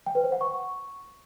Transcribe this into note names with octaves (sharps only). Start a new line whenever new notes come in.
G5
B4
C5
F#5
C#6